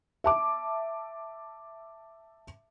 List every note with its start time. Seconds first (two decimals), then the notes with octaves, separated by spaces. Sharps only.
0.24 E5 A5 D6